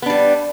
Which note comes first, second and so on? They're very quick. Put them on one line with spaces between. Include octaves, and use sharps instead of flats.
B3 D4 G3